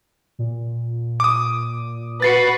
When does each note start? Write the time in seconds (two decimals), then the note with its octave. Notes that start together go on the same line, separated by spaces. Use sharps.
0.39 A#2
1.20 D6 D#6
2.22 F#4 B4 A6 C7 C#7